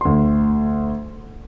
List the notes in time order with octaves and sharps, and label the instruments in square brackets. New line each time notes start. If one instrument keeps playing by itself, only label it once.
[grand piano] D2 C6